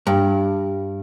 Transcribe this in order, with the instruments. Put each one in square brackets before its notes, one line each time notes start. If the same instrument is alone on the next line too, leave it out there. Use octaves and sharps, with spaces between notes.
[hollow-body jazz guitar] G2